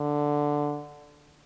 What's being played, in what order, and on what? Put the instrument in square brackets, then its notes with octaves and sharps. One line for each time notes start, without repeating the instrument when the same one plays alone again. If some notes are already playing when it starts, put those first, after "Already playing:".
Already playing: [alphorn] D3